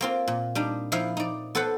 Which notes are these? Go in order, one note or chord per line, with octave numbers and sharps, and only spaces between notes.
A#3 C4 F4
A#2
G3 D4 D#4
F3 D#4 E4 E5 F5
D#4 D5
B3 A4 B4 C5 F#5